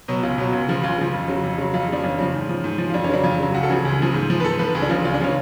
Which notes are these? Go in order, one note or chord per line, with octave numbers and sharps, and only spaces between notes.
B2 F#3
C#2 F4
B2 F#3
C#2
C#3 F3
C#2 F4
C#3 F3
F2
C#3 F#3
F2
C#3 F#3
F2 F4
C#3 F3 D4
F2 C#4
C#3 F3
G#2
F3
G#2
F3
F4
F2 D4
C#4
C#3 F#3 D4
F2 F4
C#3 F#3
C#2 F#4
A4
C#3 F3 G#4
C#2
C#3 F3
G#2
F3
B4
G#2 A4
F3 B4
C#2 G#4
D4
C#3 F3 F4
C#2 F4
D4
C#3 F3 C#4